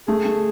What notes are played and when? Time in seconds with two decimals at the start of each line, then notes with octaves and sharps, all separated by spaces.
0.08 A3 G#4
0.25 A3